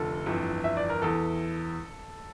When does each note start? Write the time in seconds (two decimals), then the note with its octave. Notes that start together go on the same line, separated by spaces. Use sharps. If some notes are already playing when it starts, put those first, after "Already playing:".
Already playing: F1 D3 F3 A4
0.26 G1 F2 E3
0.64 E5
0.77 D5
0.90 A#4
1.02 E2 E3 A4